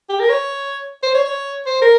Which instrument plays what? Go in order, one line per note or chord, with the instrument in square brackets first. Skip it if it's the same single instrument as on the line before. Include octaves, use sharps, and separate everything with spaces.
[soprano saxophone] G4
A#4
C#5
C5
C#5
C#5
C5
A#4